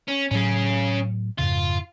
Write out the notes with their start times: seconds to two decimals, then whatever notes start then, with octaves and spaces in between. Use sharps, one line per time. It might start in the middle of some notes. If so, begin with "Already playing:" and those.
0.08 C#4
0.31 A2 F#3 C#4 G#4
1.38 F2 G#2 C#3 F4